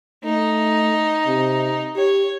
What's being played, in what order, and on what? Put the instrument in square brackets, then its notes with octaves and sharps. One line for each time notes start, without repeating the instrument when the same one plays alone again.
[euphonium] A3 [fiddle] D#4
[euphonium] C3
[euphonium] G4 [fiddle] C#5